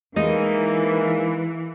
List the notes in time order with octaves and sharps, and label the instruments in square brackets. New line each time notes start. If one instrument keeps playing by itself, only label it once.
[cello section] E3 [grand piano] G#3 [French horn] A#3 [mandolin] D#4